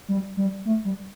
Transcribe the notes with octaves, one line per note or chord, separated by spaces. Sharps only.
G3
G3
A3
G3